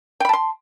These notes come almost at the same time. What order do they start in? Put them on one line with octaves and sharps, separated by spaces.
G5 B5 A5 C6